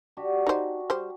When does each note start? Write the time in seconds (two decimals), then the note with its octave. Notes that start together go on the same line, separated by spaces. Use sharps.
0.17 D4 F#4 G4
0.47 D#4 C5
0.90 G3 C5